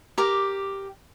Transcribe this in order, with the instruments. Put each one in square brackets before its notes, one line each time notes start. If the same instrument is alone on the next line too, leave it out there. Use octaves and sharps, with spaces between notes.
[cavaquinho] G4 A#4 D6